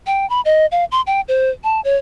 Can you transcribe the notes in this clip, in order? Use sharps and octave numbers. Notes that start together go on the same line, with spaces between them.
G5
B5
D#5
F5
C6
G5
C5
A5
C#5